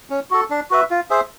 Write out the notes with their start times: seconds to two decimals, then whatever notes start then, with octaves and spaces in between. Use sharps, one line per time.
0.10 C#4
0.31 F#4 A4
0.50 D4
0.70 F#4 B4 E5
0.90 F4
1.10 G#4 C5 E5